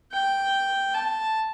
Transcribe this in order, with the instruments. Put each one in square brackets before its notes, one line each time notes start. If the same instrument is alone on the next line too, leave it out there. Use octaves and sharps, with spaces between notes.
[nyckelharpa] G5
A5